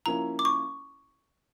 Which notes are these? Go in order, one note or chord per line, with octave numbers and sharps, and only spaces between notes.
F3 A#3 C#4 E4 A#5
D6
C#6